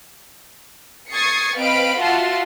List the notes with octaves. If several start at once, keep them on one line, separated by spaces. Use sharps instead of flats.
C#6 D#6 G#6 A6 C7 C#7
C4 B4 D#5 F5 B5 D7
F4 F#4 E5 F#5 A5 C6